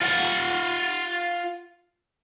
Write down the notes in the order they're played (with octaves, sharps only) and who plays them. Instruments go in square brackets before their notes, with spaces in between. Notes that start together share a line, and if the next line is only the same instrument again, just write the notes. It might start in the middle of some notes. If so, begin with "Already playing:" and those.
[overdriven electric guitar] F4 F#5